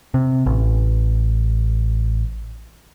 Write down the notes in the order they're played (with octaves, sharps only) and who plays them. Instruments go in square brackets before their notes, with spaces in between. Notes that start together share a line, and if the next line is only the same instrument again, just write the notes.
[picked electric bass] C3
A1